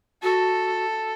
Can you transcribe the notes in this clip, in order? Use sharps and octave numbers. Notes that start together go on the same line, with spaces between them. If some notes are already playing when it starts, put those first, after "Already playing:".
F#4 A4